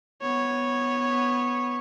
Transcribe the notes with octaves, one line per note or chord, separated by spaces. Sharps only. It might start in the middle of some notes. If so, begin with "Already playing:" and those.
B3 C#5